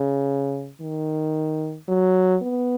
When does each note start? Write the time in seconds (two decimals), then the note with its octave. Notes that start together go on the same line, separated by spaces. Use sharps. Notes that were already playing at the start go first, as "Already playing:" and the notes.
Already playing: C#3
0.81 D#3
1.88 F#3
2.43 B3